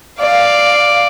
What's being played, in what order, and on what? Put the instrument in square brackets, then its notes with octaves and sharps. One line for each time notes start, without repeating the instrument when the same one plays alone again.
[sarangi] D5 [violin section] F5